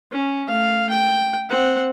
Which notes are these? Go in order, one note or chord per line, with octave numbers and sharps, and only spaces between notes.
C#4
A3 F5
G5
C4 F#5